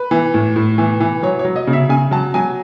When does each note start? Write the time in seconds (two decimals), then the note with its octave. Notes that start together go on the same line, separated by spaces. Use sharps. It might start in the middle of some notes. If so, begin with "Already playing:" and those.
Already playing: B4
0.11 E3
0.34 A2
0.56 A2
0.78 E3
1.00 E3
1.23 F#3 C#5
1.39 C#5
1.45 F#3
1.56 D#5
1.67 C#3
1.73 E5
1.89 C#3 G#5
2.11 F#3 A5
2.34 F#3 G#5